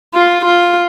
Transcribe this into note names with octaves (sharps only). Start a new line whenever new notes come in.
F4
F4